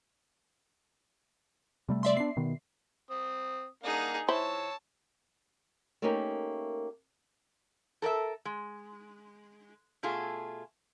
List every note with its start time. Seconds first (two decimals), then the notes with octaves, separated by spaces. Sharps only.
1.89 C3 G3 A3
2.03 D5 E5 C6
2.17 B3 D4 C7
2.37 B2 D#3 B3
3.11 C4 D#6
3.83 A#3 D4 D#4 G#4 F#5
4.28 E4 C5 C#5 A5 E6
6.02 A3 A#3 C#4 D#4 G4 A#4
8.02 A4 A#4 D5 E5
8.45 G#3
10.03 B2 A3 F4 G#4